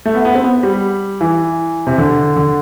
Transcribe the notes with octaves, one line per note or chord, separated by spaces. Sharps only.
A3
B3
B3
C4
B3
G3
E3
C3
D3
D3